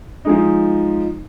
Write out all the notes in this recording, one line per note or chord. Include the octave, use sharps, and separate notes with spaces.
F3 G#3 D#4